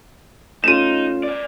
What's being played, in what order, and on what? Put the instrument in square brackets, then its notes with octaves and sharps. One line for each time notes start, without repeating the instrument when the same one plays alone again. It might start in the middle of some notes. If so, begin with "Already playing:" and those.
[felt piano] A3 C#4 F4 [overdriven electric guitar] D#4 [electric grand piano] D#7 E7
[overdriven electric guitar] A#4 D5